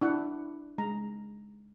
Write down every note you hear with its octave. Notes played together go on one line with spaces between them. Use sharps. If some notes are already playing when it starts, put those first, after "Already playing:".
D4 E4 F#5
G#3 A#5